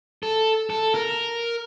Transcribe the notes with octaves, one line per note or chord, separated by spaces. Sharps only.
A4
A4
A#4